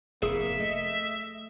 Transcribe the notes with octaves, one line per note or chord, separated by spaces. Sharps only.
F1 A2 A#3 G#4 E5
A3 D#5